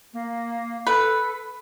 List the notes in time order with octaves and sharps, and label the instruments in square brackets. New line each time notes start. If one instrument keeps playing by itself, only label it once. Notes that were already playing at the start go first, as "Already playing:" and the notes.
[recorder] A#3
[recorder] A4 [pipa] B4